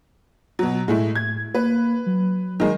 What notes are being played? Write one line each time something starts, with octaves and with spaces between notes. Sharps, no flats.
B2 F#3
A2 G#3 A3 E4
G#6
A#3 B4
F#3
D#3 G#3